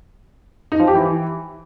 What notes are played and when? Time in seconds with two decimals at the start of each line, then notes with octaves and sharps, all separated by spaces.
0.72 D#4
0.80 F3
0.87 G4
0.95 E3